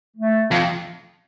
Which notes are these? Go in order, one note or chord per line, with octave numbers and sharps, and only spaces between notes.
A3
F2